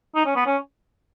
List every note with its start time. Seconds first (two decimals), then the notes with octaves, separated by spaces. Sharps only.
0.15 D#4
0.25 C#4
0.36 B3
0.46 C#4